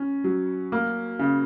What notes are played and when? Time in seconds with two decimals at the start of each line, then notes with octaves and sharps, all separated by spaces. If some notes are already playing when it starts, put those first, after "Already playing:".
Already playing: C#4
0.24 F#3
0.72 A#3
1.19 C#3